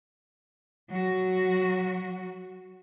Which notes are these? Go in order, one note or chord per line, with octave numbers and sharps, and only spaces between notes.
F#3 F#4